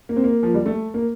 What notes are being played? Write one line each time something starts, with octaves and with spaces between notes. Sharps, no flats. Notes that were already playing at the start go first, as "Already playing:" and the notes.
A#3
C4
A#3
F3
G3
A3
A#3